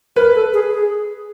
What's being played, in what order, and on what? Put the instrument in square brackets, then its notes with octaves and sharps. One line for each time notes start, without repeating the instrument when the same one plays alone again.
[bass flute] A#4 [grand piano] B4
[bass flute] A4
G#4
G#4